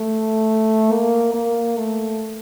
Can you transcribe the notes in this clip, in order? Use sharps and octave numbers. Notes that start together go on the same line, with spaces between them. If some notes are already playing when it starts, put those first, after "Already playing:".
Already playing: A3
A#3
A#3
A3